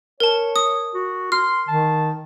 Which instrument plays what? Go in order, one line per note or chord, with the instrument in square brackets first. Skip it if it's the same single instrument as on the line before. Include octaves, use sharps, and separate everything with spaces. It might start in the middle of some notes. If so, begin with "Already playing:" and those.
[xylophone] A#4 A5 [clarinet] C#5
[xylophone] D#6
[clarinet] F#4
[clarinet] C6 [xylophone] F6
[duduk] D#3 [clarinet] A5